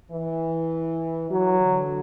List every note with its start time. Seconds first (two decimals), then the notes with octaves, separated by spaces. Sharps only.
0.11 E3
1.30 E3 F#3
1.61 D3